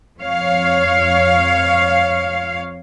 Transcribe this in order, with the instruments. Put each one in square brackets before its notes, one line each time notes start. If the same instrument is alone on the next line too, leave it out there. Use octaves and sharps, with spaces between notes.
[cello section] F2 C#5 F5